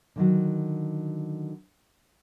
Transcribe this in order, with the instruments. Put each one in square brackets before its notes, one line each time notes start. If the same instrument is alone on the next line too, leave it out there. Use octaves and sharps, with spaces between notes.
[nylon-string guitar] D3 D#3 F#3